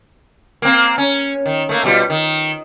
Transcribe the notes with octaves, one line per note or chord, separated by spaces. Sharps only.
A#3 C4
C#4
D#3
A3 A#3
B2 G3 F4
D#3